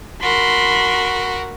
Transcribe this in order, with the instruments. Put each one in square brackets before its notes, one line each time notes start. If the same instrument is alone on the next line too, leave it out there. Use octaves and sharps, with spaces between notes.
[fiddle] F#4 A#4 [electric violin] B5 C6